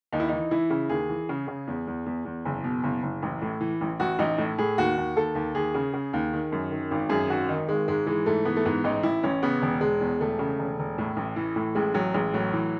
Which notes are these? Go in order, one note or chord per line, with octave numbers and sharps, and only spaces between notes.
D#2 D#4
E4
E3 D#4
E3 E4
C#3
D#2 G#4
E3
C#3
C#3
E2
E2
E2
E2
F#1
B2
F#1
F#1
A1
A2
E3
A1
A1 F#4
A1 D#4
A2
A2 G#4
D#2 F#4
D#2
D#2 A4
D#2
D#2 G#4
C#3
C#3
D#2
D#3
F#2
D#3
G#1
F#2 G#4
G#1 F#4
D#3 D#4
G#1 G#3
G#2 G#3
E3 G#3
G#2 A3
E3 B3
A3
G#2 B3
A1 D#4
A1 E4
A1 C#4
C#3 B3
E1
E1 G#3
E2
E1 A3
C#3
E1
E1
A2
A1
E3
A2
A1 G#3
A1 F#3
A1 G#3
A2 F#3
E3